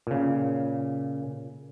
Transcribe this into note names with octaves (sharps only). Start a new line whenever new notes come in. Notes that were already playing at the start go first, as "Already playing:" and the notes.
A#2 C#3